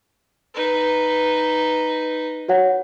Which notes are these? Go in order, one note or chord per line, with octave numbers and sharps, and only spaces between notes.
D#4 B4
F#4 C#5 F#5